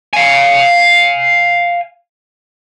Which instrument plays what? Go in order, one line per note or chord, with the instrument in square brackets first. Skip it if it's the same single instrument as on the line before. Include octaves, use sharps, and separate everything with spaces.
[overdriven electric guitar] F5 G#5